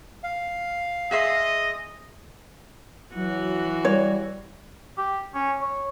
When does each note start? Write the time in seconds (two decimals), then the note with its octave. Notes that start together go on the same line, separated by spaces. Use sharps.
0.24 F5
1.11 G#4 D#5 E5 C6
3.15 E3 F#3 F#4
3.85 G3 C#5
4.98 G4
5.35 C#4
5.61 C#5